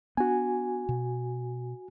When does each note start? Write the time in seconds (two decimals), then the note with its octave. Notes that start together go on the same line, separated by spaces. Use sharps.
0.17 B3 D4 F#4 G#5
0.89 B2